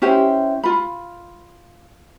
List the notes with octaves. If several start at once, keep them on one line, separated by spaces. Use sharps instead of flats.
C#4 E4 G4 C5
F4 B5